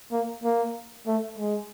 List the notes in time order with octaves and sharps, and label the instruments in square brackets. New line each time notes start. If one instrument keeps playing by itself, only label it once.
[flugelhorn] A#3
A#3
A3
G#3